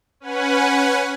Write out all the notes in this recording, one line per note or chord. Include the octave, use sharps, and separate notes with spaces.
C#4 B4 F#5 G#5